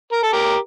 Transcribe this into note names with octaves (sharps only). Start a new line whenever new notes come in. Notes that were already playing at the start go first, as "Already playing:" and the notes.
A#4
A4
G4 A#4